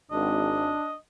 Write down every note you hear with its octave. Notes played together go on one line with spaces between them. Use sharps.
G#1 D4 D#5